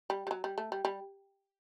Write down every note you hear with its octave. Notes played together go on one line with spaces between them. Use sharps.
G3
G3
F#3
G3
A3
G3
G3